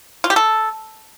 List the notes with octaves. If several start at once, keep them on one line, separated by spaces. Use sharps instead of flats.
F4
G4
A4